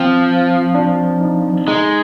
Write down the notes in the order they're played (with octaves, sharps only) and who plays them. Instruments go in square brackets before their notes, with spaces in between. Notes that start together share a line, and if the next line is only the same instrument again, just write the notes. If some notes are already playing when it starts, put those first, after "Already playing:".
Already playing: [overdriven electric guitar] F3 [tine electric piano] C4
[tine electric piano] D4
D#4
[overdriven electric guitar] G#3 [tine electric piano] D#4